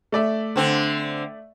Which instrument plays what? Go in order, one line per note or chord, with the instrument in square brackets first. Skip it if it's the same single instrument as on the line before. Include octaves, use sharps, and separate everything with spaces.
[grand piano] A3 D5 E5
[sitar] D3 C4